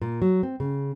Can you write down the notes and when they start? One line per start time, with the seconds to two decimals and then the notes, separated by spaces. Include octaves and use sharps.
0.02 A#2
0.22 F#3
0.43 C4
0.60 C#3